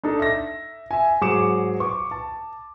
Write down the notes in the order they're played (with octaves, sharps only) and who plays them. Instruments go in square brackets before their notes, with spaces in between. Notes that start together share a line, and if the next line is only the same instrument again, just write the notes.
[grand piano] D4 D#4 A4
E5 A#6
E5 G#5
G#2 F#3 G#4 D6 C#7 E7
B4 C#6 D6
A5